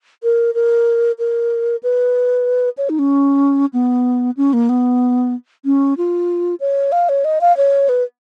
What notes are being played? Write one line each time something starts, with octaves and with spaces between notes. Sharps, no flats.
A#4
A#4
A#4
B4
C#5
D#4
C#4
B3
C#4
A#3
B3
C#4
F4
C#5
F5
C#5
D#5
F5
C#5
B4